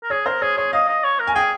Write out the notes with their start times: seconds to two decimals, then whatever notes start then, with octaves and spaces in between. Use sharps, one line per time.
0.03 A#4
0.10 G#4 C#5
0.26 A#4 C5
0.42 G#4 C#5
0.57 G#4 C#5
0.72 D#5 F5
0.88 D#5
1.04 C#5
1.19 A#4
1.27 G#5
1.35 G#4 G5